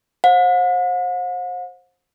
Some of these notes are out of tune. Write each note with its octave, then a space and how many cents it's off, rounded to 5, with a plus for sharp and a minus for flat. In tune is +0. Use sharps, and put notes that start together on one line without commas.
C5 +20 F#5 -45